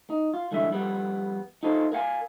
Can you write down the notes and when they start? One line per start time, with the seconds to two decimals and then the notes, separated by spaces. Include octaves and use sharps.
0.10 D#4
0.34 F4
0.51 C2 D3 E3 G#3 E5
0.71 F2 G3 B3
1.63 D#4 F4 A4 C5
1.92 A#4 F5 F#5 G#5